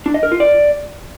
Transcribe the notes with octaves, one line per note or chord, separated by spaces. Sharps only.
D4
D#5
A#4
F4
D5